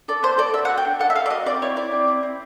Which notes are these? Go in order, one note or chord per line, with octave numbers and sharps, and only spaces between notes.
A4 D5
B3 C5
A4 D5
F#4 E5
F#5
F#4
G5
D4
A4 F#5
E5
A4 F5
D5
F#4 D#5
C4 D5
E4 C#5
E4 D5
C4
E4
C4